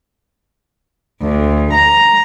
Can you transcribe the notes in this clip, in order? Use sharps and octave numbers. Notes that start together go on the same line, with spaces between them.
D2
A#5